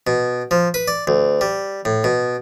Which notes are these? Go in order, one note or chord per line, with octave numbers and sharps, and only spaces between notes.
B2
F3
B4
D5
D2
G3
A2
B2